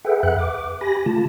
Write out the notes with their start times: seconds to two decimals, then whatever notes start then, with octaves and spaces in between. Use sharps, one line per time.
0.05 G#4 A4 B4 E5 F#5 G5
0.23 F2 B4 E5 F#5 F#6
0.38 D6
0.81 G4 G#5 B5 A#6
1.06 C#3 A3 F4 A5